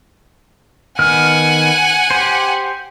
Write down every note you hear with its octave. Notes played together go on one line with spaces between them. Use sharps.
D#3 B3 F#5 G#5 F6
G4 C5